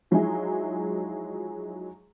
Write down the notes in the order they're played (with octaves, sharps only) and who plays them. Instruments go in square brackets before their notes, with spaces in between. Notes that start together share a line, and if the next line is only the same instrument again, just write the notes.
[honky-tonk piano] F3 F#3 G#3 D#4 E4 G#4